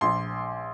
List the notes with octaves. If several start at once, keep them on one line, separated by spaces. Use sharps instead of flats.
A#1 C6